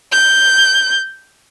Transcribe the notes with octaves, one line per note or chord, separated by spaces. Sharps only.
G6